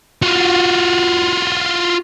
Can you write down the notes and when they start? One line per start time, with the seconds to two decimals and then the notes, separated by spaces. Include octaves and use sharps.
0.22 F4 F#4